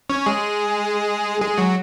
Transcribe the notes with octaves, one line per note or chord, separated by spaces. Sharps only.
C#4 C#5
G#3 G#4
G#3 G#4
F#3 F#4